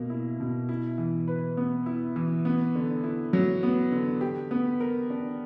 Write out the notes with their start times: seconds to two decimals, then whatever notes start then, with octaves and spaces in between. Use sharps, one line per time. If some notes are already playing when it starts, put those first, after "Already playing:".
Already playing: B2 A#3
0.10 E4
0.40 B2
0.69 E4
0.98 E3
1.28 B4
1.57 B3
1.86 E4
2.16 E3
2.45 B3
2.75 D3
3.04 E4
3.33 F#3
3.63 B3
3.92 D3
4.21 G4
4.51 B3
4.80 A#4
5.10 D4